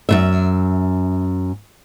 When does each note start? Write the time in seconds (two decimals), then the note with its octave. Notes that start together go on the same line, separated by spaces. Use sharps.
0.09 F#2 C#3 E5